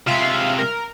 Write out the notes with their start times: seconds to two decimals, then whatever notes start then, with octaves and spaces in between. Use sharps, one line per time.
0.07 C3 G#3 F4 E5 F5
0.59 A#4